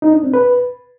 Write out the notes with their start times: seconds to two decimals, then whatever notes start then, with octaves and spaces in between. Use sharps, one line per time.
0.02 D#4
0.13 D4
0.23 C4
0.34 B4